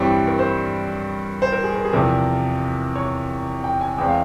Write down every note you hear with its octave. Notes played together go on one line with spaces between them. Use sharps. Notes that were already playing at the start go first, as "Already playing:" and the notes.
Already playing: G2 E3 G3 C4 C#5
A#4
C5
C5
A#4
G#4
A#4
G#4
E2 C3 F3 A#4
C#5
G5
G#5
E2 E3 G#3 C4 G5
F5